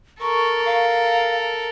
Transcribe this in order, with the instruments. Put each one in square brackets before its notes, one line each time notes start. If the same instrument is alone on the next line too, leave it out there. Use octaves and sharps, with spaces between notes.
[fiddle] A4 A#4 [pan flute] C#6
[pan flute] F5